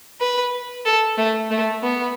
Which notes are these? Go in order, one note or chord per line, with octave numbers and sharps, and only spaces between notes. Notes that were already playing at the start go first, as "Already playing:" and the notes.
B4
A4
A3
A3
B3